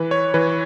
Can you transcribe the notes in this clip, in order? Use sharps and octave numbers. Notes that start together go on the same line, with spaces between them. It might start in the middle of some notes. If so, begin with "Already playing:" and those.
Already playing: E3 B4
C#5
E3 B4